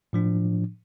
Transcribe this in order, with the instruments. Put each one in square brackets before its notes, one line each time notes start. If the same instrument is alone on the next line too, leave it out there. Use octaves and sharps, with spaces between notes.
[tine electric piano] A2 F3 D4